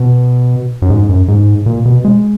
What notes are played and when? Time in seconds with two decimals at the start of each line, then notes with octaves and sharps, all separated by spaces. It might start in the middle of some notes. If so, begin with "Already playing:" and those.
Already playing: B2
0.82 F#2
0.90 G#2
1.09 F#2
1.28 G#2
1.66 A#2
1.85 B2
2.05 G#3